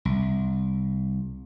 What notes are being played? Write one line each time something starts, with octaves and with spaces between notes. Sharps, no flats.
C2